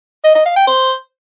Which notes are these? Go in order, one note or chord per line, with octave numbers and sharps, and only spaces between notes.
D#5
D#5
F5
G5
C5